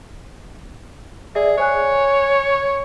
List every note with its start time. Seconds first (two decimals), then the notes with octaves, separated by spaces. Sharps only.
1.35 G#4 D5 E5
1.57 C5 C#5 G#5 F#6